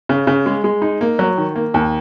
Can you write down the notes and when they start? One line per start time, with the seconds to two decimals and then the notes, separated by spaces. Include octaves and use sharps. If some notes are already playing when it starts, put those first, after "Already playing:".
0.09 C#3
0.27 C#3
0.46 G#3
0.64 G#3
0.82 D#4
1.01 A#3
1.19 F#3
1.38 D#3
1.56 A#3
1.74 D#2